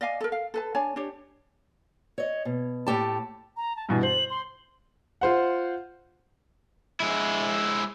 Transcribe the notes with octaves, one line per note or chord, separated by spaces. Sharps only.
D5 D#5 F5 G#5
A4 A#4
F5
A4 B4 A5
D4 C#5 G#5 A5
D4 G4 C#5
C#5 D#5
B2
A2 G4 A5
A#5
A5
G2 B2 E3 G#5
C5 F#7
C6
F4 C5 F#5
G#3 E4